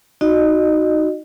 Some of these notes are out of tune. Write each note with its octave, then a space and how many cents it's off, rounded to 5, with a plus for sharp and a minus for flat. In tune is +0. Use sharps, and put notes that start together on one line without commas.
D#4 +0 F#4 +0 D#5 -35